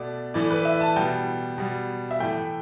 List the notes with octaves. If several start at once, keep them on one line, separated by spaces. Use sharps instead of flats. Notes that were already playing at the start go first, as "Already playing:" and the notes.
Already playing: B2 A3 D5
A2 E3 A3 D5
B4
E5
A5
B2 G3 G5
B2 G3
E5
A2 E3 A3 G5